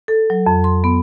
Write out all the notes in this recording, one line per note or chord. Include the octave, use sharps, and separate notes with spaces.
A4
F#3
F2
C6
B3